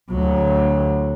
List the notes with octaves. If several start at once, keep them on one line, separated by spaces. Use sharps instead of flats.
D2 F#3